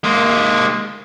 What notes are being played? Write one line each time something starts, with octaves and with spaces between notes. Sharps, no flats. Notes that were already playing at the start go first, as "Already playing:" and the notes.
G#3 A#3